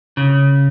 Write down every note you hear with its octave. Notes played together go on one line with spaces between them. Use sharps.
C#3